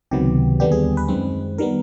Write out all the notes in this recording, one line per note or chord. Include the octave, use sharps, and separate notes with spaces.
C#2 C3 D#3 F#3 B3 G4
D#2 D3 G3 B3 D4 G4
G#4
B4
F#2 D#3 G#3 C4
D#3 G3 B3 A#4